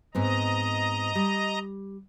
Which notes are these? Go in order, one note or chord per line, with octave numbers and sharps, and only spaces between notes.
G#2 B3 C4 D#5 A#5
G3